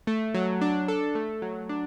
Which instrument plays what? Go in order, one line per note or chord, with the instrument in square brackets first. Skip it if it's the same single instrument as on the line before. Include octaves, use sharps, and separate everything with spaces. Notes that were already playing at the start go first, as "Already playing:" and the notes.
[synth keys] A3
F#3
D4
A4
A3
F#3
D4